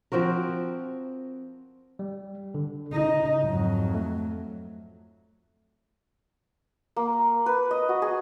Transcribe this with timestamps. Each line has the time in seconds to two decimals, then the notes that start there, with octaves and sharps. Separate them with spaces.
0.12 F3 C4 F#4 A#4
1.99 G3
2.54 D3
2.93 C#3 D#4
3.43 F2 G#2 F#3
3.94 A3
6.96 A#3
7.46 B4
7.71 D#5
7.89 F#4
8.02 G#4